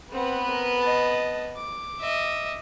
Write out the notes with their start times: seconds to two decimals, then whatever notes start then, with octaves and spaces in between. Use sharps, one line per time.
0.12 B3 C4 B4 F#5
0.50 A#4
0.80 D#5 A5
1.56 D6
2.00 D#5 E5